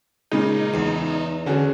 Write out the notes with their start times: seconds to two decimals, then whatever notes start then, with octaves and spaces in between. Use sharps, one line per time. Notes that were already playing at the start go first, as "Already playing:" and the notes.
0.31 A#2 C#3 G#3 D#4
0.74 E2
1.46 D3 C#4 F#4 G#4